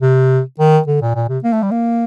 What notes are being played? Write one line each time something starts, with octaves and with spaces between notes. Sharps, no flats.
C3
D#3
D3
A#2
A#2
C3
A#3
A3
G3
A#3